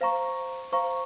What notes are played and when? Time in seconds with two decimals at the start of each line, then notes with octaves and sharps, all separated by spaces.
0.01 C5 F5 A#5 C#6
0.72 C5 F5 A#5 C#6